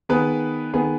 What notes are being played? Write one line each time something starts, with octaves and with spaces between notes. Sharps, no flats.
D#3 B3 G#4 B4
D#3 B3 G#4 B4